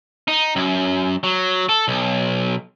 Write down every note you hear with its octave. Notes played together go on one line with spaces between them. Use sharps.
D#4
F#2
F#3
A4
B1